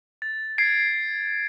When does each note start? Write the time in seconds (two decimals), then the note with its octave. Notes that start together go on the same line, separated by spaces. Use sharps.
0.22 A6
0.58 G#6 A6 C7 D7